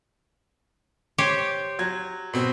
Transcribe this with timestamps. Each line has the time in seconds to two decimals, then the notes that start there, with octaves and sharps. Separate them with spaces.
1.18 G4 C5 C#5
1.79 F#3 G#6
2.33 B2 C4